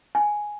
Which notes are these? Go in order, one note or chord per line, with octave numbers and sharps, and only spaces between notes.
G#5